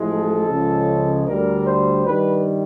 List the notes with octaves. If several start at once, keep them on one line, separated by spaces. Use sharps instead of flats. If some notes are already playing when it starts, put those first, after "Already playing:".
Already playing: A1 A2 F3 G#3
A4
C#2 C#3 F3 G#3
D2 D3 G3 A#4
C5
G2 D#3 G3 B4